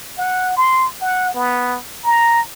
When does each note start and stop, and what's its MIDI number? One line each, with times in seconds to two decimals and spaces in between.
0.18 0.54 78
0.57 0.87 84
1.01 1.34 78
1.35 1.78 59
2.04 2.40 82